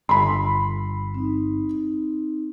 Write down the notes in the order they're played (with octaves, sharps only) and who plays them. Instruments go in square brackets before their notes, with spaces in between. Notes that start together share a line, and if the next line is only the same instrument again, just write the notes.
[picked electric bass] G1 [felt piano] B5 C6
[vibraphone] C4 D#4